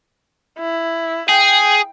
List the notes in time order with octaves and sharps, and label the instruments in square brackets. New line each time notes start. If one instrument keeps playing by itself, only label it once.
[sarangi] E4
[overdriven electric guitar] G#4 [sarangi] G5